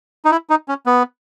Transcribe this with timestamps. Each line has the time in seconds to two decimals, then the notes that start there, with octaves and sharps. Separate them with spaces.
0.25 D#4
0.31 E4
0.50 D#4
0.68 C#4
0.86 B3